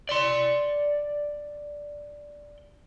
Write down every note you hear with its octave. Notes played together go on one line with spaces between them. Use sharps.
D5 C6